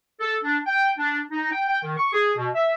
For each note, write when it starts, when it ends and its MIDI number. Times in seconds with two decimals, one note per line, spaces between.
0.21 0.36 69
0.44 0.58 62
0.67 0.91 79
0.99 1.20 62
1.31 1.52 63
1.52 1.63 79
1.68 1.79 79
1.83 1.96 51
1.98 2.11 85
2.13 2.32 68
2.37 2.48 47
2.55 2.74 76